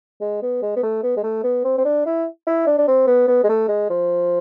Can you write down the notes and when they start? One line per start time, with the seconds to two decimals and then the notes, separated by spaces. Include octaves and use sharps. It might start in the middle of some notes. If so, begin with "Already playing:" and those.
0.21 G#3
0.42 B3
0.62 G#3
0.76 B3
0.83 A3
1.03 B3
1.17 G#3
1.23 A3
1.44 B3
1.64 C4
1.78 C4
1.85 D4
2.06 E4
2.47 E4
2.67 D4
2.78 D4
2.87 C4
3.07 B3
3.28 B3
3.43 G#3
3.49 A3
3.68 G#3
3.90 F3